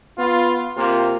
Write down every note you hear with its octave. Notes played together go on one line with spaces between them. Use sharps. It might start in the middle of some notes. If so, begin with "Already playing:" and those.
B3 F4
C3 A#3 F4